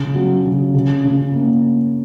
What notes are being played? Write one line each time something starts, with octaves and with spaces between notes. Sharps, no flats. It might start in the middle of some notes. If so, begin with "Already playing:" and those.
Already playing: C#3
F#3
C#3
C#3
C#3
A#3